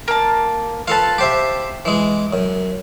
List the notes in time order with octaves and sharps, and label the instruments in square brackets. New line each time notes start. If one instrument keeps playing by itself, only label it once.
[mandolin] A#3 A5
[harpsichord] F4 A4 B4 [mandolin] F5 A5
[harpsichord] G4 C5 E5
E3 G#3
F#2